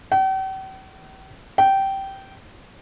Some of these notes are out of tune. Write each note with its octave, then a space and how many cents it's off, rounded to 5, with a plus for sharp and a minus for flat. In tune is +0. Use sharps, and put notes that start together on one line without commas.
G5 -45
G5 -15